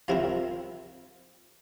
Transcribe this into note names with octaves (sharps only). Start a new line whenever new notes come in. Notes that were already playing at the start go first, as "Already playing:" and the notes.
C3 F3 C4 E4 A#4